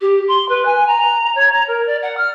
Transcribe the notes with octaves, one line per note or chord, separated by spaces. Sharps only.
G4
C6
B4
G#5
A#5
C#5
A#5
A#4
D5
F#5
F6